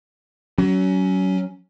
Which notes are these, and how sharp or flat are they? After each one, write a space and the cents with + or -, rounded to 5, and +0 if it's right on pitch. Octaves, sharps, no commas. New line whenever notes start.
F#3 +25 C#4 +20